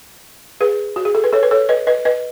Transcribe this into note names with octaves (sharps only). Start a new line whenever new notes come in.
G#4 B4
F#4
G#4
A4
B4
A4 C#5
B4
A4 C#5
B4 D#5
B4 D#5
B4 D#5